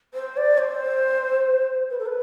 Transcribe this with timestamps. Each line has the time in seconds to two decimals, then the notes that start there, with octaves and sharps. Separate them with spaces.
0.14 C5
0.37 D5
0.58 C5
1.90 B4
1.99 A4
2.06 B4